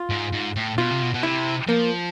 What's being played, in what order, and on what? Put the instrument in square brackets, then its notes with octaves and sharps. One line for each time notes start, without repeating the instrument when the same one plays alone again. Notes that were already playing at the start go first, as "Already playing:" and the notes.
Already playing: [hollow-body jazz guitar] F4
[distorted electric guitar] G#2
G#2
A2
[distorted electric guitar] B2 [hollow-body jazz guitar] F4
[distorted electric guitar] C3
B2
B2
[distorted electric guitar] C3 [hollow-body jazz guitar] E4
[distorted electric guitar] F3 [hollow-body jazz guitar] A#3